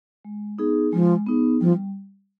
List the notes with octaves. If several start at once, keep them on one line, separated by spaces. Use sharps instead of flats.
G#3
B3 D#4 G#4
F3 G#3
B3 D#4 G#4
F3 G3